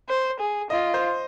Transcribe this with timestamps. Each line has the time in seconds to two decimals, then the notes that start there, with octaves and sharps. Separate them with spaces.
0.09 C5
0.40 G#4
0.70 F4 D#5
0.94 C5